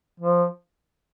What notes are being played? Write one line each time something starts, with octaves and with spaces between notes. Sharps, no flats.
F3